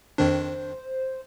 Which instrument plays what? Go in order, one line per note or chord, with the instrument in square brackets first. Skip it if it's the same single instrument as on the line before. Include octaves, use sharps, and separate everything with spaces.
[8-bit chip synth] F2 D#3 D4 [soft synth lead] C5